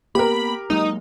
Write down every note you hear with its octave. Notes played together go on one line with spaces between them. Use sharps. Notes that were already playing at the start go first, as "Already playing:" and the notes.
A#3 B3 G4 A#4 B5
F#3 G#3 A#3 D#4